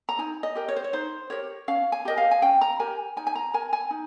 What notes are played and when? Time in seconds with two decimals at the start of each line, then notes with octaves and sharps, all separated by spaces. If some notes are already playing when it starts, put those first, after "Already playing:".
0.09 A#5
0.18 D#4 G#5
0.43 D#5
0.55 G4 A#4
0.68 C#5
0.76 C5
0.84 C#5
0.93 D#4 C5
1.30 G4 A#4 C#5
1.68 C#4 F5
1.92 G#5
2.05 G4 A#4 D#5
2.18 F5
2.31 G#5
2.42 C#4 G5
2.61 A#5
2.79 G4 A#4 G#5
3.17 D#4 G#5
3.27 G#5
3.35 A#5
3.54 A#4 G#5
3.73 G#5
3.91 D#4